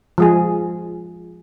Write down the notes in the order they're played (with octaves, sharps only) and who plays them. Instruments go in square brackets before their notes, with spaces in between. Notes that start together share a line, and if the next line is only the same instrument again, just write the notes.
[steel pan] F3 G#3 G#4